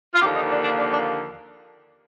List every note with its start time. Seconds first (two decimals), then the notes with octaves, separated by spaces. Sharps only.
0.14 F4
0.21 D#2 D3 F3 A#3 G4
0.36 D#4
0.50 D4
0.63 D4
0.78 D4
0.92 D4